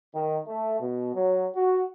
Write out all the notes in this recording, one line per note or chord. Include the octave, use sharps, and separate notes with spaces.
D#3
A3
B2
F#3
F#4